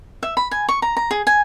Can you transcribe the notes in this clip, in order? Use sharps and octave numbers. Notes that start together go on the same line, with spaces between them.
E5
B5
G#5
C#6
A#5
A#5
G#4
G#5